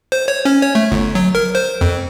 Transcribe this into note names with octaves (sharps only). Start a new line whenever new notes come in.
C5
C#5
C#4
C#5
A3
G1
F#3
A#4
C5
F2